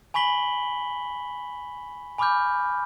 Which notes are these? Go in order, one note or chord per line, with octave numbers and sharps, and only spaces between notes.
G#5 B5 C#6 B6 F#7 G7
G#5 B5 C#6 D6 F6 G6